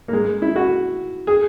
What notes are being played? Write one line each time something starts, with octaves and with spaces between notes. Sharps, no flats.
A#3
G#3
E4
F#4
G#4